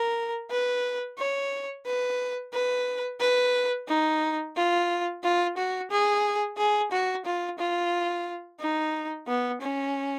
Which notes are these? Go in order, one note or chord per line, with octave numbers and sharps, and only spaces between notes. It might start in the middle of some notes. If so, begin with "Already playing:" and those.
Already playing: A#4
B4
C#5
B4
B4
B4
D#4
F4
F4
F#4
G#4
G#4
F#4
F4
F4
D#4
B3
C#4